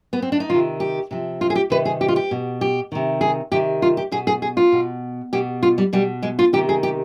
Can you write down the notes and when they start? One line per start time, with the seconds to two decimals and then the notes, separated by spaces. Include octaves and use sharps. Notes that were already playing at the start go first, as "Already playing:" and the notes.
0.13 B3
0.22 C4
0.32 D4
0.40 D#4
0.50 C3 D#3 F4
0.80 G4
1.11 C3 F3
1.41 F4
1.50 G#4
1.55 G4
1.70 C3 D#3 B4
1.85 G#4
2.01 G4
2.08 F4
2.16 G4
2.31 B2
2.61 G4
2.92 C3 D#3
3.21 G#4
3.52 C3 D#3 G4
3.82 F4
3.97 G4
4.12 B2 G#4
4.27 G#4
4.42 G#4
4.57 F4
4.72 B2
5.33 B2 G4
5.63 F4
5.78 G3
5.93 B2 G3
6.23 G#3
6.39 F4
6.53 C3 D#3 G4
6.69 G#4
6.83 G4